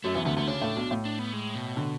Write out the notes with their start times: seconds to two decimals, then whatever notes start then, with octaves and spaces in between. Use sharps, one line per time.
0.04 F#2 F#3 A3
0.14 E2 E3 B3
0.25 D2 D3 B3
0.37 D2 D3 B3
0.47 C#3 C#4 D4
0.61 A2 A3
0.76 B1 B2
0.91 A2
1.05 D4
1.19 B3
1.33 G#3
1.55 B2
1.77 D3